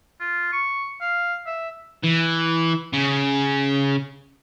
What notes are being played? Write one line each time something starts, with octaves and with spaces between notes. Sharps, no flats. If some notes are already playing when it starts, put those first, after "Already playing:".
F4
C#6
F5
E5
E3
C#3